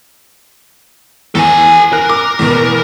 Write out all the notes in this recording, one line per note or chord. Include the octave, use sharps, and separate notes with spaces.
E2 A4 G#5
A#4 F#6
D6
E2 B2